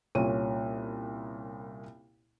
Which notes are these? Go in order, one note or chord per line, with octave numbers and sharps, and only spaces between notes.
C2 A#2 C#4 C#5 D#7